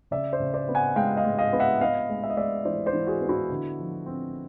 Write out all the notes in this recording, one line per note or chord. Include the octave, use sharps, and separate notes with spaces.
C#3 D5 E5
C5 D5
C#3
C5 D5
B3
F#5 G#5
G#3 F5 G5
D#5 F5
G#3
D#5 F5
B3
E5 F#5
B3 D#5 F5
G#3
E5
D#5
G#3 D5 E5
E3 C5 D5
C5 D5
E3
F#4 G#4
B3
E4 F#4
D3
F3
C4